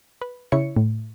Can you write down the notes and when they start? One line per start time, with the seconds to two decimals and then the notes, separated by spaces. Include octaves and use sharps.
0.22 B4
0.52 C#3 E4 C#5 C#7
0.77 A2